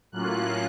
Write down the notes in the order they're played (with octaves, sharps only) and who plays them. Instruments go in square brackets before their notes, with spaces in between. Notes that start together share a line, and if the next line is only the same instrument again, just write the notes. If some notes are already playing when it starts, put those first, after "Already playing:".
[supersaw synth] A2 F#3 A#3 C#4 F4 F#6